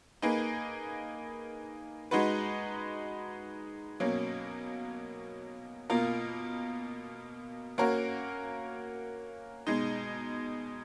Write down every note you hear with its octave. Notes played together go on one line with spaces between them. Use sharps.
A#3 D#4 G#4 B4
G#3 D#4 F#4 B4
B2 F#3 A#3 C#4
B2 A#3 F4 A#4
A#3 C#4 F#4 A#4
B2 G#3 D#4